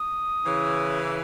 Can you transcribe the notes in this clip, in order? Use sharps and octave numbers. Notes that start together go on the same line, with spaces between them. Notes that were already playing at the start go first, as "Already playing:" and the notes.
Already playing: D#6
C#3 E3